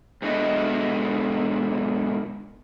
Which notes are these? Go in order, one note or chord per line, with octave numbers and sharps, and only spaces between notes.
G#2 B2 D3 E4 F#4 D#5